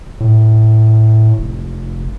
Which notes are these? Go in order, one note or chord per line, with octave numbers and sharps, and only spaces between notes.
A2
F1